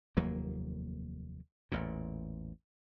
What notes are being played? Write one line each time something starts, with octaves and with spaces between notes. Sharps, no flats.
F1 D#2 F#3 A#3
A1 E2 A#2